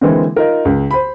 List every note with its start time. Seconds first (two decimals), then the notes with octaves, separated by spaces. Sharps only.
0.01 D3 E3 G#3 A#3 C4
0.36 D#4 F4 A#4
0.65 C#2
0.91 C5 B5